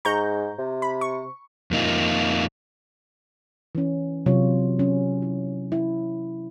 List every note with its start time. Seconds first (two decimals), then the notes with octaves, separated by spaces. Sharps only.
0.05 G#2 A#5 C#6 G6
0.59 C3
0.82 B5
1.01 C#6
1.71 F2 A#3 D#4 F4
3.75 E3 C#4
4.26 C3 F#3 F4 C#5
4.79 F#3 C#4
5.22 E4
5.72 E4